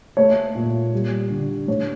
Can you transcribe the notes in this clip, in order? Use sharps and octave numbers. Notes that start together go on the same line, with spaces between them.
A3 C#5
A#2
G3
D3
A2 C#5